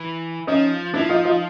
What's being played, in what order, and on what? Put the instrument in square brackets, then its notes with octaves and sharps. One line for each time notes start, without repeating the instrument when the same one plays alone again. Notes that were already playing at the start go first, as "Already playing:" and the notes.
Already playing: [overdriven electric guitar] E3
[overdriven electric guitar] F3 [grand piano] C#4 D#4
[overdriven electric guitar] F3 [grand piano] D4 E4
[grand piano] D#4 F4
D#4 F4